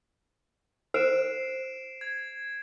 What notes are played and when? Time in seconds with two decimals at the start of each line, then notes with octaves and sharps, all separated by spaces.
0.94 C5 C7 D7 E7
2.01 G#6